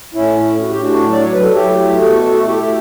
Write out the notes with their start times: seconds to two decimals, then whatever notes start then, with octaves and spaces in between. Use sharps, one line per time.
0.14 A2 C#4 E4
0.45 A2
0.61 F#4
0.71 G4
0.76 A2 D4 F#4
1.08 F#3 D5
1.22 C#5
1.33 B4
1.39 F#3 A4
1.55 E4 G4
1.69 A3
2.00 B2 F#4 A4
2.32 A3
2.43 A4
2.47 E4 G4
2.62 A3